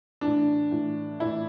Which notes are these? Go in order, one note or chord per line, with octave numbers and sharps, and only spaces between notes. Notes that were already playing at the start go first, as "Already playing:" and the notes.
A2 E3 D4
A2 E3
A2 E3 E4